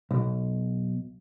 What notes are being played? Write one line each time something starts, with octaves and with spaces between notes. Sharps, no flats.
B1